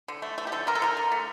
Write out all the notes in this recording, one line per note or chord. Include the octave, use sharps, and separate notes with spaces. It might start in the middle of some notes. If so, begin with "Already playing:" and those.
D3
A3
A3
G4
D3 A4
D3 A#4
A4
D3 A#4
D3
A3